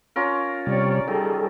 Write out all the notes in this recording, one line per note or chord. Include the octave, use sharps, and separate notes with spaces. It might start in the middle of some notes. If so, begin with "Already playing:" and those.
C#4 F4 A#4
C3 G3 C#5 D5
D#3 G3 G#4 A4